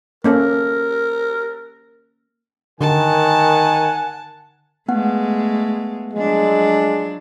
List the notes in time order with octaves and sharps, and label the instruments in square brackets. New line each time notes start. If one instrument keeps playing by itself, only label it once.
[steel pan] A#3 C#4 A4 [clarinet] A#4
[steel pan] D3 [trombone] D#3 [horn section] A#4 F#5 G#5 [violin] A5
[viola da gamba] G#3 A3 [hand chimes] B3 F#5
[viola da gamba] F3 F#3 D4 [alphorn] G#3